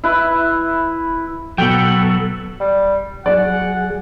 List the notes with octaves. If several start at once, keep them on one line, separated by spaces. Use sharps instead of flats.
E4 B4 E5
B2 F#3 F#4 A4 G5
G3
F#3 G#4 D5 F#5